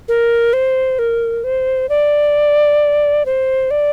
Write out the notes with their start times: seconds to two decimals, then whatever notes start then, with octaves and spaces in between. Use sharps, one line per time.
0.08 A#4
0.53 C5
0.99 A#4
1.44 C5
1.89 D5
3.26 C5
3.71 D5